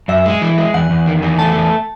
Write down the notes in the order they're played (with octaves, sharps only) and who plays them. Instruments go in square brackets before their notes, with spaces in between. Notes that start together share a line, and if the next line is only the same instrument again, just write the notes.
[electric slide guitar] F#2 [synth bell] E5
[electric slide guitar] G#3
E3
G#3
[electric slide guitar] E2 [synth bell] F#5
[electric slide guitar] E2
D#3
E2
[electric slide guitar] A3 [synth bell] A5
[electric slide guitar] E2